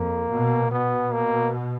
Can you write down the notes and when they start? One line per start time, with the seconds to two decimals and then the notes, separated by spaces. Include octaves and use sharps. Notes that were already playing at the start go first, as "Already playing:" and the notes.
Already playing: F2 A#3
0.30 B2
0.71 B2 B3
1.13 A#3